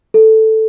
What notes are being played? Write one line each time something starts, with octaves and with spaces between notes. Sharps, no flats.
A4